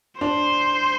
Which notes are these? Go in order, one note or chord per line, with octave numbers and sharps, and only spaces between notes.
D4 C5